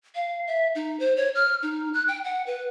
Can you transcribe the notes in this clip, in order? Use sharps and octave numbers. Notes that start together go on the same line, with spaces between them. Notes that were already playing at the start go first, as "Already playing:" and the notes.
F5
E5
D#4
C5
C#5
F6
D#4
F#6
G5
F#5
B4